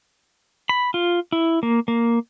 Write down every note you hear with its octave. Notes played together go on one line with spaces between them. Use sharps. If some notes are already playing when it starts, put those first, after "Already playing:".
B5
F4
E4
A#3
A#3